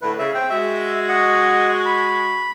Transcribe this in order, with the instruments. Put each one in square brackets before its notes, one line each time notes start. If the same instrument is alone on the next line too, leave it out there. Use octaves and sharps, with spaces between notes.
[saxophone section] A2 D3 A3 [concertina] B4
[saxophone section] C#3 [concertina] E5
[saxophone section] C4 [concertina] G5
[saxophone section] G#3 F#4 [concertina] E5
[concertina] D#5 F#5
B5